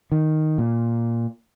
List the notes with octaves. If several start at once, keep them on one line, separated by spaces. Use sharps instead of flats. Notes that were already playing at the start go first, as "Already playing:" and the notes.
D#3
A#2